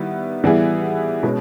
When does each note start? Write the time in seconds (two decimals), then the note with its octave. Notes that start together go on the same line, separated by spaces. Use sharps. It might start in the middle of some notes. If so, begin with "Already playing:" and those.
Already playing: D#3 G3 B3 E4
0.44 E3 G3 B3 E4 G#4
1.23 B2 G#3 C#4